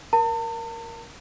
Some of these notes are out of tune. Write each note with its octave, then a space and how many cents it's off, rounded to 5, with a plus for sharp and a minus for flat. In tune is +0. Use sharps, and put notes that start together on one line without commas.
A#4 +10 A5 +45